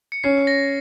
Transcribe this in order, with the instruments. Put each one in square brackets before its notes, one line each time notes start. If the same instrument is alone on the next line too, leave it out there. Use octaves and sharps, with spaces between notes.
[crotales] C#7
[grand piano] C#4 [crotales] C7
[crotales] A#6